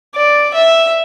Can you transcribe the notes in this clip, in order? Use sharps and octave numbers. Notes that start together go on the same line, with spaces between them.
D5
E5